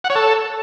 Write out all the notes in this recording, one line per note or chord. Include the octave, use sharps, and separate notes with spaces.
F#5
C#5
A4